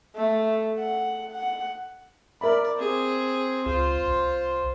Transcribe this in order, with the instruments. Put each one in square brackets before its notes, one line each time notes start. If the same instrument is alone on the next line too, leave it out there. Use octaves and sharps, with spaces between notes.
[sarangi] A3
F#5
F#5
[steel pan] A#4 E5 B5 [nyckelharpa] D5
[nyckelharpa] C4 G#4
[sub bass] C#2 [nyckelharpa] F4 C5
[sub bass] C2